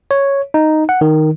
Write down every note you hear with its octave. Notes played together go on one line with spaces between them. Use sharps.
C#5
D#4
F#5
D#3